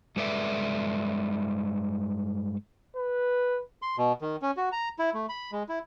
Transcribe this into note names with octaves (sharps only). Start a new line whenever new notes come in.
G2 G#3 A4 B4 D5 E5
B4
C6
B2
D#3
C#4
F#4
A#5
E4
A3
B5
G#3
E4